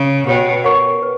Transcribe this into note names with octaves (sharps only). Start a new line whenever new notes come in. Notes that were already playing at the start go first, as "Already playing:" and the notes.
Already playing: C#3
B2 G4 C#5 G5
A#4 C#5 F#5 A#5 C#6
B4